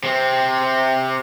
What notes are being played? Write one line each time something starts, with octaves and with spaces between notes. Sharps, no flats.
C3 C4